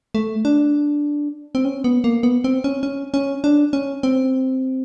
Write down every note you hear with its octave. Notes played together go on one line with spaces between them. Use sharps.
A3
D4
C4
C#4
B3
A#3
B3
C4
C#4
C#4
C#4
D4
C#4
C4